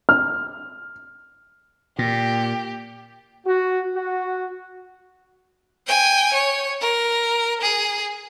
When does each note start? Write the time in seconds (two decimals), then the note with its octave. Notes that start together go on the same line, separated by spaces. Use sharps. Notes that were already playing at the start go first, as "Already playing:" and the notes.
0.09 F6
1.99 A#2 G4
3.46 F#4
3.95 F#4
5.87 G5 G#5
6.33 C#5
6.81 A#4
7.62 G#4